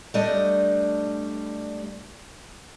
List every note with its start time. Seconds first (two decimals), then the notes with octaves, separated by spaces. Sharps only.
0.14 G3 A3 D4 D5 D#5